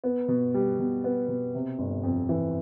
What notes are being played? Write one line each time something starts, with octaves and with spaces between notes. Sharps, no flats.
B3
B2
G3
B2
B3
B2
C3
G1
F2
E3